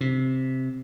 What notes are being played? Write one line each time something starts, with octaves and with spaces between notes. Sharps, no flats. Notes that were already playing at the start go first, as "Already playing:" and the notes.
C3